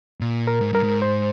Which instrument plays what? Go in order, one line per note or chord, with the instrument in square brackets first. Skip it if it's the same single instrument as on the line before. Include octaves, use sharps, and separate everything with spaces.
[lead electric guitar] A#2
[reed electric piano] A#4
[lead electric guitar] G#2
[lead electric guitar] G2 [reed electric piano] A#4
[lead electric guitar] G#2
[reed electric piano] C5